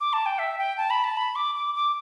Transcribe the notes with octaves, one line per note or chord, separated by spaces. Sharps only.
D6
A5
G5
E5
G5
A5
B5
A5
B5
D6
D6
D6